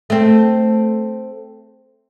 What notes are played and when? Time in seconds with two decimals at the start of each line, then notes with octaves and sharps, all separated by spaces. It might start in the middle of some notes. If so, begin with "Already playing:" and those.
0.10 A3 C4